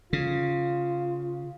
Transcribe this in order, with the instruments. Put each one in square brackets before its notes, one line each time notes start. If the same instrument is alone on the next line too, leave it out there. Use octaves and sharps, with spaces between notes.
[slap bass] C#3 [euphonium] F4